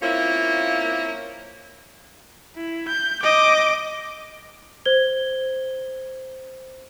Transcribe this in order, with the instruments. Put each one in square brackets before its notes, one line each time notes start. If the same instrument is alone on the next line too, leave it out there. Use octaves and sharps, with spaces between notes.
[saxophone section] A#3 C4 C#4 E4 F4
[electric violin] E4
G6
D#5 D6
[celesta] C5 G#6 G7